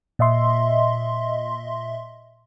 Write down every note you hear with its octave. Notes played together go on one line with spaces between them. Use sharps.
A#2 D#5 E5 C6